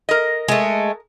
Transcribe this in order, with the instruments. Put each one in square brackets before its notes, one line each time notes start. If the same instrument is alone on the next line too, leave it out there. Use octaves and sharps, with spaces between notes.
[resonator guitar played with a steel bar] A#4 D#5
[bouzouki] G#3 A3